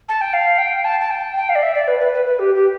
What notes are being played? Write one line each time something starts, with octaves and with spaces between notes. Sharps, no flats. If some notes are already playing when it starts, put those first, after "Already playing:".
A5
G5
F5
G5
A5
A5
G5
G5
F5
D5
E5
D5
B4
B4
B4
B4
G4
G4